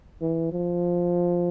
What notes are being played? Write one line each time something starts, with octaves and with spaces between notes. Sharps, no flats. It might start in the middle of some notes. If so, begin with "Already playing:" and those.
E3
F3